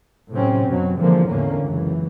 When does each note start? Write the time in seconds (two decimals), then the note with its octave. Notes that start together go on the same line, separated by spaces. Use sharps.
0.31 A2 C3 F#3 C4 C#4
0.67 F#2 B2 F#3
0.97 F2 D3 E3 F3 G#3 A#3
1.26 E2 A2 D3 E3 A#3 C#4
1.64 C#2 F#2 E3